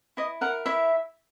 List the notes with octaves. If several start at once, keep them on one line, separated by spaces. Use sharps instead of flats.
E4 D#5
A#4 F#5
E4 E5